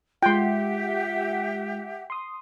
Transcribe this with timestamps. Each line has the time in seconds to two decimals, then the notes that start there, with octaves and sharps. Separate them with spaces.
0.23 G#3 F4 G4 E5 F#5 G5 C6
2.10 C6 D#6